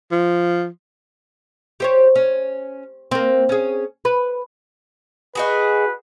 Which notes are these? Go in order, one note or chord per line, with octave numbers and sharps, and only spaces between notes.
F3
G4 C5 C#5
C#4
A#3 C4
C#4 G#4
B4
D#4 F#4 G#4 B4